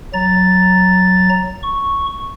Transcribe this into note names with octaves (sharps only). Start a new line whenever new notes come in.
F#3 A#5 A6
C#6